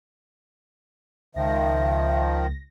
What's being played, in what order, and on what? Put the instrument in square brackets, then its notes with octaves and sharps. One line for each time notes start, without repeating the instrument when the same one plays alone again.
[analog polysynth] C#2 A#6 [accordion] D#3 F3 [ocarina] E5